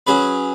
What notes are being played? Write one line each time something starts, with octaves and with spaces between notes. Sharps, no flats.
F#3 C#4 G#4 B4